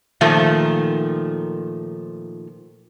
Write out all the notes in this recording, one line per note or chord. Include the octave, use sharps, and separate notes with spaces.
A#2 D#3 F3 A3